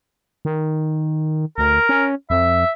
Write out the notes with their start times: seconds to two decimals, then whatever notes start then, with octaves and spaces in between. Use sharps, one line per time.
0.45 D#3
1.58 D2 A#4
1.89 C#4
2.30 F2 E5